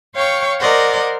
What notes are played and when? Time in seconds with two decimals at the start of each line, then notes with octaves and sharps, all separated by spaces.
0.14 C#5 F5 G5 C#6
0.60 A#4 C5 D5 D#5 F#5